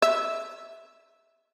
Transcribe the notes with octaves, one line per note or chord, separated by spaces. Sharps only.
E5